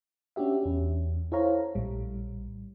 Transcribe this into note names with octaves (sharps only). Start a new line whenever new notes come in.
C#4 D4 F#4 G4 E5
E2 C#4
E4 A4 C5 C#5 F5 A#5
A#1 A2 G3